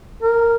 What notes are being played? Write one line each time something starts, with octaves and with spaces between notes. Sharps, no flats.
A#4